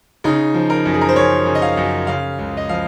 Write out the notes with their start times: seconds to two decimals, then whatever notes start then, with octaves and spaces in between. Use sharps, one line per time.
0.24 C#3 D#4
0.54 F3
0.70 A#4
0.85 F#2
0.94 G#4
1.01 A#4
1.09 C5
1.16 F#2 C#5
1.46 C#3
1.55 D#5
1.62 F5
1.77 F#2
2.07 C#3 F5
2.39 C#2
2.57 D#5
2.69 F3 F5